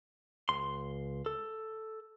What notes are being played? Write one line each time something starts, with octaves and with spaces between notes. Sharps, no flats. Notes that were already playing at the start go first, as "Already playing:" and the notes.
C#2 C6
A4